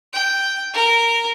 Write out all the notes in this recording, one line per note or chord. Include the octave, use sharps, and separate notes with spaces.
G5
A#4